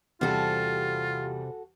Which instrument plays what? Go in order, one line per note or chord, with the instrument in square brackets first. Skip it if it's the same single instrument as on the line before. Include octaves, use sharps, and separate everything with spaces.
[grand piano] E2 G3 [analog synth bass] C3 [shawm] F4 [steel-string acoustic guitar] F#4 A4